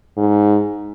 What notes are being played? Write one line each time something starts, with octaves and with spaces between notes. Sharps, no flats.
G#2